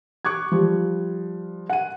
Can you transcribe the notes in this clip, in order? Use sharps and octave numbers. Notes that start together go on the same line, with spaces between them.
C#6 D6 F#6 G#6
F3 G3
F#5 D#7